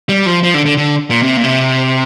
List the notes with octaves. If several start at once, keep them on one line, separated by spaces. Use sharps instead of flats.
G3
F3
F3
D3
D3
D3
A#2
C3
A#2
C3